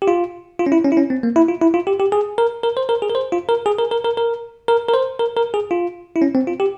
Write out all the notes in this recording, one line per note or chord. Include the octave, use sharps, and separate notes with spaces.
G4
F4
F4
C#4
E4
C#4
E4
C#4
C4
A#3
E4
F4
E4
F4
G4
G4
G#4
A#4
A#4
C5
A#4
G#4
A#4
C5
F4
A#4
G#4
A#4
A#4
A#4
A#4
A#4
A#4
C5
A#4
A#4
G#4
F4
E4
C#4
C4
F4
G4